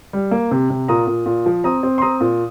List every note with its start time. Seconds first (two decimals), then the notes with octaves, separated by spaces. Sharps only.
0.13 G3
0.31 A#3
0.51 C3
0.70 C3
0.88 A#2 A#5 D#6
1.07 A#2
1.26 A#2
1.46 F3
1.64 C4 A#5 D#6
1.83 C4
1.98 C6
2.02 C4 A#5 D#6
2.21 A#2